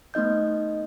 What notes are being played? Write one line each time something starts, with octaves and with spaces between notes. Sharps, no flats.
A3 B3 D#4 D#5 G6